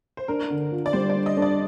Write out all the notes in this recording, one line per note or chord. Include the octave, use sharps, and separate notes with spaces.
C5
D4 A#4
D3
F4
D5
G3 C5
D5
D4
D#5
D4
D5